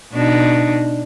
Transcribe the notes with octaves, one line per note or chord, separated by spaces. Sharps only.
B2 D4 D#4